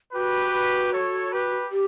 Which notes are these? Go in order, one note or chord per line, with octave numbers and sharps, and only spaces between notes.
F#4 G4 B4
A4 C#5
G4 B4
G4